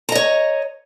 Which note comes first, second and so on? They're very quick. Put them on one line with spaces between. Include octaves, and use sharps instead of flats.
A#5 D#5 C#5